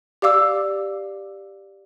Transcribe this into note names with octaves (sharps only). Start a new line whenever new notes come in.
G4 D5 F5 D6 E6